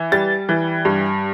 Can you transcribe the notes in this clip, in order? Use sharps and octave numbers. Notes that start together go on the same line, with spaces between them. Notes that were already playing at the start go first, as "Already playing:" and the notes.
Already playing: E3
G3 A6
E3
G2